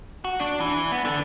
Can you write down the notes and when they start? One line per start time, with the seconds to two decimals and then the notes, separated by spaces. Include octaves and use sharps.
0.25 F#4
0.40 D4
0.60 E3
0.92 B3
1.05 D3 D4